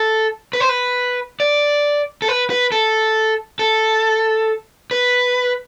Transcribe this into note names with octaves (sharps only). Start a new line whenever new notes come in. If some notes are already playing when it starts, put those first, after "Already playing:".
Already playing: A4
B4
C5
B4
D5
A4
B4
B4
A4
A4
B4